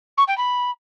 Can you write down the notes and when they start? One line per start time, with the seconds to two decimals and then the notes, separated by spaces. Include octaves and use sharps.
0.17 C#6
0.27 G5
0.37 B5